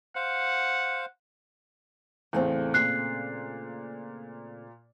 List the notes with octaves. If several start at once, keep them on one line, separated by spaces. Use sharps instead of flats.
C5 F5 F#5
E2 A2 C#3 A3 C4
A#2 F#6 C7